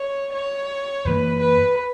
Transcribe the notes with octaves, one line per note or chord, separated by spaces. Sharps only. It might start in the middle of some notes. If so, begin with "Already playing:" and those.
Already playing: C#5
C#5
F#2 E3 A#3 B4
B4